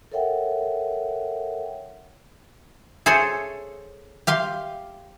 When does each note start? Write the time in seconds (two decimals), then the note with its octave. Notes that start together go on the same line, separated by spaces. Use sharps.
0.12 A4 A#4 C#5 E5 F#5 G5
3.06 G#4 A4 C5 C#5 G#5
4.27 G4 F5 C6